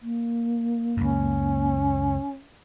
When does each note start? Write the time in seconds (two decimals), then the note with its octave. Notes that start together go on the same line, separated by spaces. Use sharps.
0.01 A#3
0.97 C#2 F#2 C#4